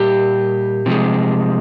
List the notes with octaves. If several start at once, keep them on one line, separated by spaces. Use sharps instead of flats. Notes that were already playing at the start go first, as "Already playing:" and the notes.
Already playing: A#2 G3 G4
C3 F3 G#3